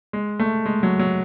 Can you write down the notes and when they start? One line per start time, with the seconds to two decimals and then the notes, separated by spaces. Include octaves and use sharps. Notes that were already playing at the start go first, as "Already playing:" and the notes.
0.13 G#3
0.40 A3
0.66 G#3
0.83 F#3
0.99 F#3